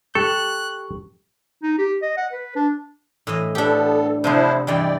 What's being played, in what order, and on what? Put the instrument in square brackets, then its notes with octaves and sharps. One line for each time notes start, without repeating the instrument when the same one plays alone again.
[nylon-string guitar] G4 [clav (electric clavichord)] A4 [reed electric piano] C#6 [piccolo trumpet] F#6
[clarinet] D#4
G4
D#5
F#5
B4
D4
[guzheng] A2 E3 D#5
[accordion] B3 A4 [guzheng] D4 G4
[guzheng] C3 F3 B3 [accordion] D4 E4 C5
[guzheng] G2 E3 G#3 [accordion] D5 G5